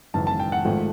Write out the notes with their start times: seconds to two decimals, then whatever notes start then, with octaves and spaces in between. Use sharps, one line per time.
0.14 G#1 F#2 C#3 E3 A5
0.27 A5
0.40 G5
0.52 F#5
0.65 G#1 G#2 F3 A3